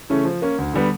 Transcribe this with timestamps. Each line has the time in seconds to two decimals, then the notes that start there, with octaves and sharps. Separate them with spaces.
0.09 C#3 E3 A3 C#4
0.25 F3
0.42 A#3 C#4
0.58 D2
0.74 D3 G3 B3